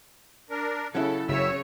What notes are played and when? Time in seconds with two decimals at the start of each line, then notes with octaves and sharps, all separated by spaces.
0.50 D4 A#4
0.95 C#3 F#3 C#4 E4 A4
1.28 F#1 C#3 C#5 E5 E6